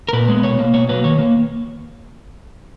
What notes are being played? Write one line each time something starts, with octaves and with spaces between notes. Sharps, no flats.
A#4
A#2 B4
G#3 B3
B2 C#5
A#3
B2 C#5
F#3 A#3 B4
D#3 C#5
A#3